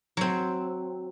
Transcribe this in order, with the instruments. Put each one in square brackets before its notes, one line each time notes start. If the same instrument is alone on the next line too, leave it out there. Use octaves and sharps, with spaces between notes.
[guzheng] F#3 C4